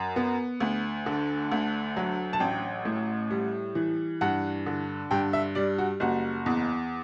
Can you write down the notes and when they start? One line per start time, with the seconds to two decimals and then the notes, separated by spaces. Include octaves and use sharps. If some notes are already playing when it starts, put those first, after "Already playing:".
Already playing: F#2
0.16 B3
0.60 D2
1.06 D3
1.52 D2
1.97 F#3
2.33 A5
2.40 A1 G5
2.85 A2
3.31 G3
3.75 E3
4.21 G2 F#5
4.66 D3
5.11 G2 G5
5.33 E5
5.55 G3 D5
5.78 F#4
6.00 F#1 F#4
6.46 E2